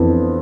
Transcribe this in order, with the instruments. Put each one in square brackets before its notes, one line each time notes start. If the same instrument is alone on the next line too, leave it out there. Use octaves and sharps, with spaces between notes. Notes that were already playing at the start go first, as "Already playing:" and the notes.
Already playing: [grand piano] F2 E3 B3 D4